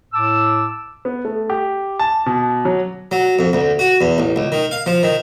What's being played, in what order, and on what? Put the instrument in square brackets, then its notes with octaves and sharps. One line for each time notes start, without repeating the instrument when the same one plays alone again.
[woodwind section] A2 A5 D6 E6
[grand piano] B3
A3
G4
A5
B2
F#3
[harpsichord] F#3
F2
D2
F#4
E2
A1
C#2
D#3
F5
F3
D#3